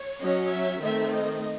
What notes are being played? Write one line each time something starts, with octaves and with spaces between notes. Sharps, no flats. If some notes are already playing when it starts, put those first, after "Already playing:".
Already playing: C#5
F#3 C#4 D#5
E5
D#3 A3 C4 E5
D#5